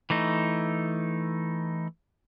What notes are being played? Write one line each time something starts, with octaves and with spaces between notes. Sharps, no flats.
E3 A3 D#4